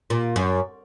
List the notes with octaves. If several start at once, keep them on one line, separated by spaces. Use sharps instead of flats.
A#2
F#2